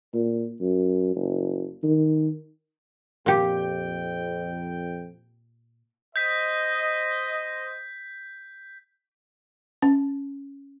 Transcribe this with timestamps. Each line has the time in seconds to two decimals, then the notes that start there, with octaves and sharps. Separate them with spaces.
0.14 A#2
0.60 F#2
1.16 F#1
1.83 D#3
3.26 F2 A#2 G4 G5
6.16 C5 D#5 G6 B6
9.82 C#4